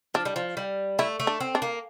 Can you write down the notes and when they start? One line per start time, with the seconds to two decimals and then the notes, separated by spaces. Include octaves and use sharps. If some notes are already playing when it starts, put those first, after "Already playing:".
0.14 F3 D4
0.25 G3
0.36 F3
0.57 G3
0.99 A3 E4
1.20 A3
1.27 D4
1.40 C4
1.55 D4
1.62 A#3